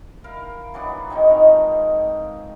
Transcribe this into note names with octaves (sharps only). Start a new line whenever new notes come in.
E4 A#4 F5 G5
E3 F#3 B3 D4
D#3 G#3 C4 D#4
G#2 D#3 F3 A#5